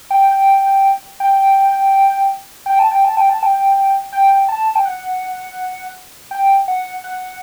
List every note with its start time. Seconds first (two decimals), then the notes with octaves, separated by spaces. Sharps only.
0.11 G5
1.20 G5
2.66 G5
2.79 A5
2.91 G5
3.05 A5
3.17 G5
3.30 A5
3.43 G5
4.13 G5
4.49 A5
4.75 G5
4.85 F#5
6.31 G5
6.68 F#5
7.04 F#5